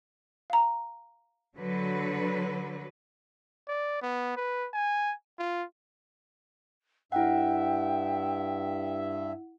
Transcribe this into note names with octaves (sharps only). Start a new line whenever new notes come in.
F5 A#5
D3 F#3 B4
D5
B3
B4
G#5
F4
G2 E4 E5 F#5 G5